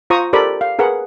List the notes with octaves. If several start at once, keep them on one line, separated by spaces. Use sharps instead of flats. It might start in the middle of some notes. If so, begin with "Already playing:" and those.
F4 C5 A#5 C#6 D#6
G4 A4 A#4 C5 D5 B5
F5
G#4 A#4 B4 F#5